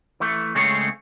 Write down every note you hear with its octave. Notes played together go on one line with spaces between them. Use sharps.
E3 A3
C#3 G#3 A3 C4 G#4 C#5